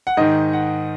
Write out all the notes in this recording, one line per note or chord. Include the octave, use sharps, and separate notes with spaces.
F#5
G#2 D#3 D#5
F#5